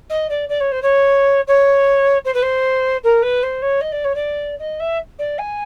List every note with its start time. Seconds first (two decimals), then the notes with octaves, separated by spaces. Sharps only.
0.09 D#5
0.29 D5
0.49 D5
0.60 C#5
0.71 C5
0.82 C#5
1.47 C#5
2.24 C5
2.34 B4
2.42 C5
3.03 A#4
3.22 B4
3.43 C5
3.62 C#5
3.81 D#5
3.92 D5
4.04 C#5
4.15 D5
4.59 D#5
4.79 E5
5.18 D5
5.38 G#5